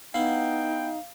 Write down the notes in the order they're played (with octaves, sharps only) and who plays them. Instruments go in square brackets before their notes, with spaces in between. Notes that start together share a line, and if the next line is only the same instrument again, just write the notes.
[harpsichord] B3 E4 [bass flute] D#4 [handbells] F5 [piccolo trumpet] G5